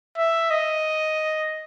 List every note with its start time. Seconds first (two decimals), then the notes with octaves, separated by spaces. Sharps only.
0.17 E5
0.51 D#5